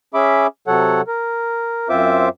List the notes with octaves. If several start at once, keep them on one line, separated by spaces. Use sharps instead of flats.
C#4 G#4 E5 B5 D6
C3 F#3 A4 C#5 F#5
A#4
F#2 C4 F4 C5 E5 D6